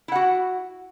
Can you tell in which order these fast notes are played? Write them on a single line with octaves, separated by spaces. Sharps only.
E4 F#5 F#4